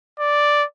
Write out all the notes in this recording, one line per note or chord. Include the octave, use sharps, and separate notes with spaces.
D5